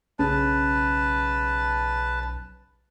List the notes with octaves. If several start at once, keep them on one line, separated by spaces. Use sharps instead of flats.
B1 C#3 B4 A5